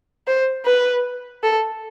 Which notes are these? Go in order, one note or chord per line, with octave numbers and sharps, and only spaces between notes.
C5
B4
A4